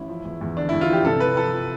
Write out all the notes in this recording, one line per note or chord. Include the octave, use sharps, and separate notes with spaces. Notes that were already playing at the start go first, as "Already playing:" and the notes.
Already playing: A1 E4
F3
E2
E2
D3 D4
E4
E2
F4
F3 G4
C3 A4
F3 B4
F3 A4
F3